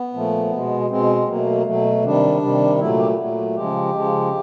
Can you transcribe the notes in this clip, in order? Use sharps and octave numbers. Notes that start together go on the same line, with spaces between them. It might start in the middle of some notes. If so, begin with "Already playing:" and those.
Already playing: B3
A#2 F3 A3
B2 G#3
B2 G#3 C4
B2 F#3 A3 A#3
B2 F#3 A3
C3 D#3 G3 D4
C3 D#3 G3
A#2 F#3 A3 E4
G4
A#2 F#3 A3
C#3 F3 G#3 G4
C#3 F3 G#3